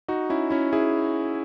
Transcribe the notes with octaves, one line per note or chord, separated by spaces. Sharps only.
D#4 F#4
C#4 E4
C#4 E4
E4 G#4